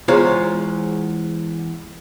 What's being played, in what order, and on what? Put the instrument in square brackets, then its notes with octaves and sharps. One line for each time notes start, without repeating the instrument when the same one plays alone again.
[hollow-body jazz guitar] E2 G#3 F4 C5 C#5 A#5